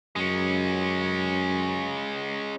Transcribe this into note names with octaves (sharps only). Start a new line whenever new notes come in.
F#2 G#3 C#4